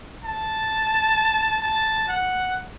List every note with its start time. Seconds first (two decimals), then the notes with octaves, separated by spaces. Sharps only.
0.25 A5
1.62 A5
2.08 F#5